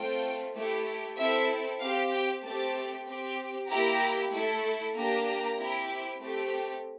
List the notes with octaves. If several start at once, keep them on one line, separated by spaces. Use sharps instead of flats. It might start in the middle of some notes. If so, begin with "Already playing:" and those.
Already playing: A3 C4 F4 G5
A3 E4 G4
C4 E4 A4 E5
C4 G4 F5
G5
A3 C4 G4 A5
C4 G4
A#3 E4 G4 A#5
A3 E4 A4
A#3 D4 G4 A#5
C4 E4 G4
A3 C4 G4